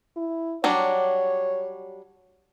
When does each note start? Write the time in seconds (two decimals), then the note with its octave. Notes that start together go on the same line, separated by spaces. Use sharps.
0.17 E4
0.64 F#3 G3 D4 C#5